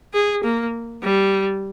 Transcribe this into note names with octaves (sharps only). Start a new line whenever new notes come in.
G#4
A#3
G3